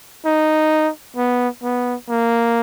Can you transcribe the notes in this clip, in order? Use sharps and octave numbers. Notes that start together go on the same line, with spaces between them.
D#4
B3
B3
A#3